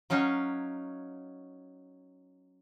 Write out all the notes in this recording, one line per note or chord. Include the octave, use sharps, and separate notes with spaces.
F#3 C#4 D#4 F5